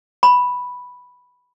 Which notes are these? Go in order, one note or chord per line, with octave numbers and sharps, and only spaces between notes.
B5